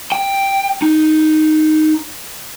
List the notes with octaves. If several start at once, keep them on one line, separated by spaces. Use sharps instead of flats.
G5
D#4